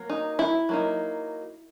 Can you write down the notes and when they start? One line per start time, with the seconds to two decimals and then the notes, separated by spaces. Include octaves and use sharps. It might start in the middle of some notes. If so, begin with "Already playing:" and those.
Already playing: F#3 A#3
0.10 D#4
0.39 E4
0.69 F#3 A#3 D#4